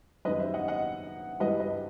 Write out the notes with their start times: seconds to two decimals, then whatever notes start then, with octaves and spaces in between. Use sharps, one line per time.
0.25 F#2 D#3 G3 B4 D#5
0.39 C5 E5
0.54 D#5 F#5
0.68 D#5 F#5
1.40 G2 E3 G3 B4 D#5
1.60 B4 D#5